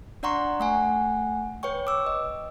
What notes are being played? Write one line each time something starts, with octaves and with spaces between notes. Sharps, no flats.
D4 D5 F#5 A#5 C6 C#6
A3 F#5 G#5
B4 C#5 G5 C#6
D6 E6
D#5